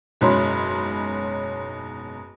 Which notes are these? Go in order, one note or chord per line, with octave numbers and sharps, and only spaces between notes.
F#1 G#2 B2 C#4 B5 C6